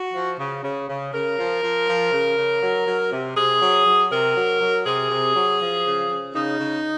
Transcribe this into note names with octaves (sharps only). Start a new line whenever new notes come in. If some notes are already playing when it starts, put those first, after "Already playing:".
Already playing: F#4
F3
C#3
C#3
C#3
C#3 A#4
F3
F3
F3
C#3
C#3
F#3
F#3
C3
C3 G#4
F#3
F#3
C3 A#4
F#3
F#3
C3 G#4
C3
F#3
F3
C#3
C#3
C#3 D#4
C#3